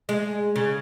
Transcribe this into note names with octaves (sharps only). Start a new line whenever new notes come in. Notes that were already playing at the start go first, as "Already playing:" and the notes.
G#3
C#3